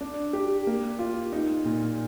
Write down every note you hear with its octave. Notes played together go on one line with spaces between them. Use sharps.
D4
G4
A#3
F4
D#4
A#2